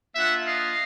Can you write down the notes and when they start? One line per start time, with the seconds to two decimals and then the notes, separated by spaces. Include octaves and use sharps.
0.15 A#3 D4 F4 E5 F#5
0.46 D#5 F5